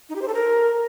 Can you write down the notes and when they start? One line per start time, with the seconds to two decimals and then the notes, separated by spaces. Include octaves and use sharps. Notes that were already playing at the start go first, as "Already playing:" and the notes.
0.09 D#4
0.16 G4
0.22 C5
0.28 A4
0.34 A#4